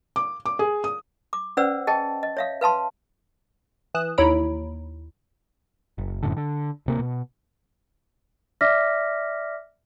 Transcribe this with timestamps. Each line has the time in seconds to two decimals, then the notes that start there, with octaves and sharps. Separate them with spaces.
0.16 D6
0.46 D6
0.59 G#4
0.84 D#6
1.33 D6
1.57 C#4 B4 C5 D5 F#5 E6
1.87 G#4 D#5 G5 A5
2.23 D#5
2.37 C#5 E5 F5
2.61 B4 F5 A5 C6
3.94 E3 D#6 F#6 E7
4.18 D#2 E4 C#5 A#5 B5 D7
5.98 F#1
6.23 F#1 F#2 A2 D3
6.37 D3
6.86 D1 C3 A#3
7.00 B2
8.61 D5 E5 D6 F6 A#6 B6